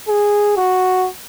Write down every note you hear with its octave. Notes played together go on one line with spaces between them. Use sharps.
G#4
F#4